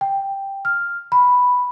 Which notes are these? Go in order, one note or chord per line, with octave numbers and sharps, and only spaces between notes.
G5
F6
B5